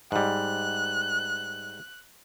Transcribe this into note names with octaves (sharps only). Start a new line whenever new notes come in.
G#2 G3 F#6